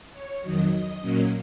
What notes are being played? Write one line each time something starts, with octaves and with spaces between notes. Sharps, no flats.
C#5
F2 D#3 F#3 D#5
D#5
A#2 F#3 A#3 C#4